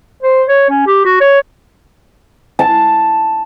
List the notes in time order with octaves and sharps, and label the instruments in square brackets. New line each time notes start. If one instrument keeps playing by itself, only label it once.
[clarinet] C5
C#5
C#4
G4
F#4
C#5
[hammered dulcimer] A5